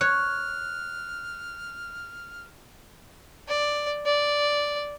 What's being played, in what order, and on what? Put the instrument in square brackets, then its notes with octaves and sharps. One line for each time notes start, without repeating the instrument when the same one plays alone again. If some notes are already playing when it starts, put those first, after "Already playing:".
[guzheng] C#5 [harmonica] F6 [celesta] F#6
[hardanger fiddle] D5
D5